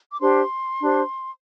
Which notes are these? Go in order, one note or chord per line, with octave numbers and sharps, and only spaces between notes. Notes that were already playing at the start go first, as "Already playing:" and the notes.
D6
D4 G4 C5 C6
D4 G4 C5